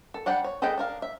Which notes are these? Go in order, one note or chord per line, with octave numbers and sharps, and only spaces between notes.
A4
G3 D4 F#5 G5
C#5
G#4 A4 B4 D#5 G5
D4 A#4 F5
E5